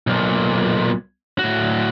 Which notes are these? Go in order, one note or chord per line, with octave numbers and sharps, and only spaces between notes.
B1 A#2
A2 F#4